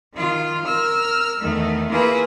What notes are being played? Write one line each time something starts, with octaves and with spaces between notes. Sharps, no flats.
D#3 F4
A#4 E6 F6
E2 D#3 A3
A#3 E4 F4 G#4 B4